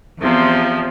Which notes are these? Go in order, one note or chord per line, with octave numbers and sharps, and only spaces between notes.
E2 C3 F3